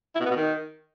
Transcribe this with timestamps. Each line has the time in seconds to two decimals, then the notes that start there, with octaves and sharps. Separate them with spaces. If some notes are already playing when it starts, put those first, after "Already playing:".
0.15 E4
0.20 B2
0.25 B3
0.30 B2
0.36 D#3